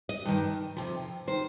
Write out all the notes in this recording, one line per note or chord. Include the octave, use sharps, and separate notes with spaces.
D#5
G2 D#3
F2 C3 F3
D#3 C5